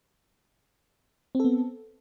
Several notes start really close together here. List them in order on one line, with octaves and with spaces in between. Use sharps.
C4 A4 B3